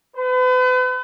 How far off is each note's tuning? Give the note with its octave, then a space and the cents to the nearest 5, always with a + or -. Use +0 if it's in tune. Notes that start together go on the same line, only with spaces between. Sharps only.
B4 +40